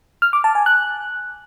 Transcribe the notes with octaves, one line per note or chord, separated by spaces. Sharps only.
F6
D6
A5
G#5
F#6